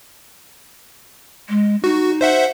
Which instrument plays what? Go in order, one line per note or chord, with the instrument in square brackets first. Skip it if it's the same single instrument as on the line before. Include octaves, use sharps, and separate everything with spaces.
[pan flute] G#3
[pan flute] D#4 [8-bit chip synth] F#4
[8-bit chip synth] C5 E5 F#5